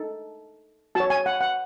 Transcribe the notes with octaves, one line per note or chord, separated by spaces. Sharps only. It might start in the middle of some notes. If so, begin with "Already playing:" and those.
Already playing: D#4 A4
F#4 C#5 A5
G#5
F#5
F#5